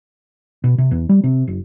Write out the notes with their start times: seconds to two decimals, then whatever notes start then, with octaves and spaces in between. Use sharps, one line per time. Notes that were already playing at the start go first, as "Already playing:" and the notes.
0.64 B2
0.78 C3
0.91 E2
1.09 G3
1.24 C3
1.47 F#1